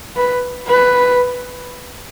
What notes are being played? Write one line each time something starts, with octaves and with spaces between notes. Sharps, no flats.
B4
B4